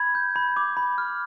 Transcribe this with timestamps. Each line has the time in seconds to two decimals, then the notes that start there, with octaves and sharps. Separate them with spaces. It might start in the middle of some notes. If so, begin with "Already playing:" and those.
Already playing: B5 G#6
0.15 G6
0.36 B5
0.57 D6
0.77 B5
0.98 F6